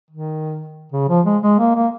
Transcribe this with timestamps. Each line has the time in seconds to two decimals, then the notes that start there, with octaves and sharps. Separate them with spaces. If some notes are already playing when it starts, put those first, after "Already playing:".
0.11 D#3
0.92 C#3
1.09 F3
1.26 G#3
1.42 G#3
1.59 A#3
1.75 A#3